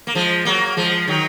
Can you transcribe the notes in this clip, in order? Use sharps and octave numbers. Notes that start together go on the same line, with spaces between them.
A#3
F3 G#3
F#3 A#3
F3 G#3
D#3 F#3